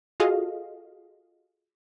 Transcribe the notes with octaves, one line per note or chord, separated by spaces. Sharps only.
F4 F#4 G#4 A4 D#5 F5